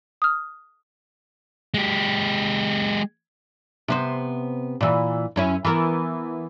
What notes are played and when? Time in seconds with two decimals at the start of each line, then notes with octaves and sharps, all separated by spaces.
0.22 D#6 F6
1.74 G#3 G4
3.88 C3 B3 C5
4.81 A#2 E3
5.36 F#2 C#4 E4
5.65 E3 B3 A#4